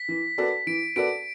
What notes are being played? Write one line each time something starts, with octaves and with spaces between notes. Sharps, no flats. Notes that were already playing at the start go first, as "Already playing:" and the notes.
Already playing: B6
E3
B3 F#4 A4 D5
E3 D7
B3 F#4 A4 D5 D7